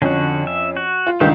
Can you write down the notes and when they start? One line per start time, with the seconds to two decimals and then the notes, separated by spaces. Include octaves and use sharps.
0.02 F2 D3 C#4 F#4
0.47 E5
0.77 F#4
1.07 F4
1.20 G1 C#2 D#3 A3 C4 G4